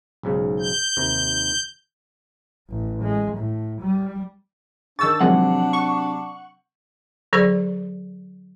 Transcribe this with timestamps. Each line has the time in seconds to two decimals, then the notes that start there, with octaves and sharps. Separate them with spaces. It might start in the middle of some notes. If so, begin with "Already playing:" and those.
0.23 B1 G#2 C#3
0.60 G6
0.97 D#2 C3
2.69 A1
3.02 G#3
3.37 A2
3.81 G3
4.99 D#3 D4 C#6 E6 G6 A6
5.21 C3 D#3 F3 F#3 G#3 C4 F#5
5.73 C#6
7.33 D3 F#3 G#4 C5 D5